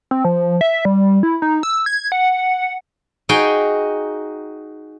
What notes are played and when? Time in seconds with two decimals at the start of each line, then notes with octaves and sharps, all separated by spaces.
0.11 C4
0.25 F3
0.61 E5
0.85 G3
1.23 E4
1.42 D#4
1.63 E6
1.86 G#6
2.12 F#5
3.29 D#4 F#4 G#4 G5 G#5